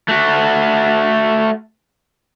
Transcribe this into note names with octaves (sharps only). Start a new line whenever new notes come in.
A3 F#4